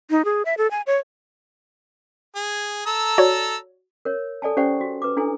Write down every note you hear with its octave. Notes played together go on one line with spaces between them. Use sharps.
D#4
G#4
E5
A4
G#5
C#5
G#4
A4 A#5 E6
F#4 C#5 D5
A#4 C#5
A4 D5 G#5 A5
C#4 G4 C5 D5 F#5 C#6
F#4
B4 D6
D4 E4 A4 G#5